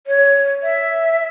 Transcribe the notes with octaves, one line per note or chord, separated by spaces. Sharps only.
C#5
E5